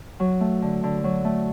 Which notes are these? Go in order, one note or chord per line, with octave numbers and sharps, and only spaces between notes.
F#3
A3
D3
D3
F#3
A3